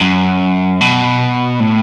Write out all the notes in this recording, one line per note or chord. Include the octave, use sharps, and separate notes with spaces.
F#2
B2
A2